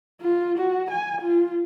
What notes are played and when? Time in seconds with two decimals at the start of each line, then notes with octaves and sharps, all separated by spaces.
0.21 F4
0.58 F#4
0.91 G#5
1.22 F4